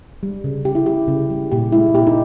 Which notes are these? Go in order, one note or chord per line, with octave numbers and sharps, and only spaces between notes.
G3
C#3
C#3 G4
E4
G3 G4
C#3
G3
A#2 G4
G#3 E4
A#2 G4
D#4